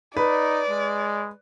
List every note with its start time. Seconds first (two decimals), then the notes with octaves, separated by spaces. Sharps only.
0.17 D#4 B4 D5
0.69 G#3